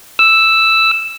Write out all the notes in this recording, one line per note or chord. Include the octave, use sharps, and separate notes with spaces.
E6